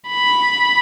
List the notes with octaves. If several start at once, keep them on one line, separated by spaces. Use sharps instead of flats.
B5